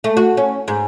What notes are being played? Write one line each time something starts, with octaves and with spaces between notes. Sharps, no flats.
A3
F#4
C#4
G#2